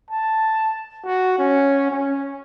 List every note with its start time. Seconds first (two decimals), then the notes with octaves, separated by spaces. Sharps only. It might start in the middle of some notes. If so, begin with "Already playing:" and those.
0.10 A5
1.06 F#4
1.39 C#4
1.90 C#4